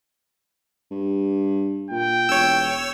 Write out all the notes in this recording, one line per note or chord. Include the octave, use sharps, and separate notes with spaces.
G2
A#2 G5
E1 C#5 E6